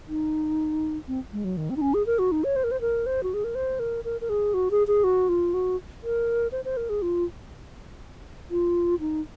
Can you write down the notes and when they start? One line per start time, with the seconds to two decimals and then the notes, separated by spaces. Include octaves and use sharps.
0.08 D#4
1.08 C4
1.33 G#3
1.44 F#3
1.57 D#3
1.70 C4
1.77 D#4
1.81 C#4
1.94 G#4
2.06 A#4
2.19 F#4
2.32 D#4
2.44 C#5
2.56 C5
2.64 A#4
2.71 C5
2.81 A#4
3.06 C5
3.23 F#4
3.34 G#4
3.44 A#4
3.55 C5
3.79 A#4
4.04 A#4
4.21 A#4
4.29 G#4
4.54 F#4
4.71 G#4
4.87 G#4
5.04 F#4
5.29 F4
5.54 F#4
6.03 A#4
6.52 C5
6.65 C5
6.77 A#4
6.89 G#4
7.02 F4
8.51 F4
9.00 D#4